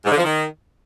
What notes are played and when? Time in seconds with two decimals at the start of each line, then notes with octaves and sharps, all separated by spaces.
0.05 G#2
0.11 D3
0.17 F3
0.23 D#3